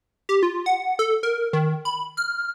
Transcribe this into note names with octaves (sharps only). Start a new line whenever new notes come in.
G4
F4
F#5
A4
A#4
D#3
B5
F6